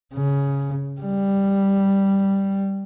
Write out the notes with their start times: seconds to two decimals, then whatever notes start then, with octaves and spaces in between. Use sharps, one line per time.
0.13 C#3
1.01 G3